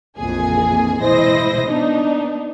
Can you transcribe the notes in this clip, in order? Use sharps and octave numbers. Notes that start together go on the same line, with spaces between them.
A#1 F2 E3 A#3 G#4 G#5
E3 G#3 E4 C5 D#5 A#6
B3 D4 D#4